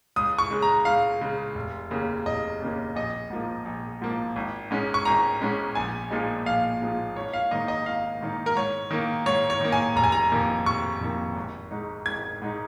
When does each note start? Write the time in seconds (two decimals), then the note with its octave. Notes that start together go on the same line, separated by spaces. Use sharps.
0.16 C#2 D#6
0.39 C#6
0.50 C#3 G#3
0.62 A#5
0.85 C#2 F5
1.21 C#3 G#3
1.55 F1
1.91 D#2 C#3 A#3 C#4
2.26 F1 D#5
2.61 D#2 C#3 A#3 C#4
2.95 A#1 D#5
3.30 G#2 F3 A#3
3.65 A#1
4.02 G#2 F3 A#3
4.36 G#1
4.71 G#2 G#3 C#4
4.94 C#6
5.05 G#1 A#5
5.41 G#2 G#3 C#4
5.75 A#1 G#5
6.10 A#2 F3 G#3 D#4
6.45 A#1 F5
6.81 A#2 F3 G#3 D#4
7.15 G#1 C#5
7.33 F5
7.51 G#2 D#3 A#3 D#4 D#5
7.68 D#5
7.86 G#1 F5
8.21 G#2 D#3 A#3 D#4
8.46 A#4
8.56 G#2 C#5
8.91 D#3 A#3
9.26 G#2 C#5
9.50 C#5
9.61 D#3 A#3
9.72 G#5
9.96 F1 A#5
10.04 G#5
10.12 A#5
10.32 F2 D#3 A#3
10.66 F1 C#6
11.01 F2 D#3 A#3
11.36 G#1
11.71 G#2 G#3 D#4
12.06 G#1 G#6
12.42 G#2 G#3 D#4